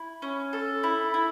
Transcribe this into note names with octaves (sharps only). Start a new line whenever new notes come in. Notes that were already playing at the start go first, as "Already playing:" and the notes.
Already playing: E4
C#4
A4
E4
E4